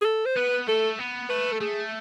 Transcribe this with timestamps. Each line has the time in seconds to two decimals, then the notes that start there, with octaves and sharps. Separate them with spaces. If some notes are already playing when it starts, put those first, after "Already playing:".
0.02 G#4
0.06 A4
0.26 C5
0.36 B3 B4
0.68 A3 A4
0.99 B3
1.29 A3 B4
1.52 A4
1.61 A3 G#4